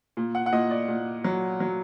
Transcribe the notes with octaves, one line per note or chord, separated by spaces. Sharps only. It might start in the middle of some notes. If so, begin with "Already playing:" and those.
A#2
F#5
F#5
A#2 D#5
D5
A#2
F#3
F#3